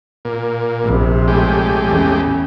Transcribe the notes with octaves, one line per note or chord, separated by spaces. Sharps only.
A#2
A#1 C3
A2 G#3 G4
E2 C#3